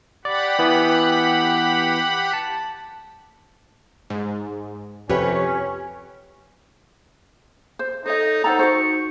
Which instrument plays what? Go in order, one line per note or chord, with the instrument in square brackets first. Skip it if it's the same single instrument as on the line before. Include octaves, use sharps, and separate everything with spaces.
[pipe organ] G4 F#5 B5 [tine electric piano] D5
[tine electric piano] E3 B3
A5
[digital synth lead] G#2
[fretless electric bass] F2 C3 [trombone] C#4 [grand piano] G4 B4 [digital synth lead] C#5
[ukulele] C5
[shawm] D#4 [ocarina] A4 [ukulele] C5 C#5 D#5
[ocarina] D#4 [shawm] A4 [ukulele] C5 F#5 A#5
[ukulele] F#4 G#4 C5 [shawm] C#6